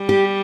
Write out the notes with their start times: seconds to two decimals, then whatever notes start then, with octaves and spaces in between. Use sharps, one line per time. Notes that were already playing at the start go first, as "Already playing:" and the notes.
Already playing: G3
0.09 G4